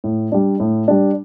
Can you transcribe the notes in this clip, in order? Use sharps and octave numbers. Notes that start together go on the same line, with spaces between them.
A2
G3 D4
A2
G3 D4